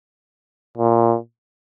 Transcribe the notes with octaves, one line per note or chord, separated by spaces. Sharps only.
A#2